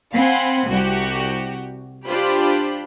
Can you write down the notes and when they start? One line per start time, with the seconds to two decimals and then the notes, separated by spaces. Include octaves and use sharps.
0.14 C4 F5 F#5 G#5 B5 C6
0.69 C2 F#4 G4
2.05 D4 F4 G4 C5 B5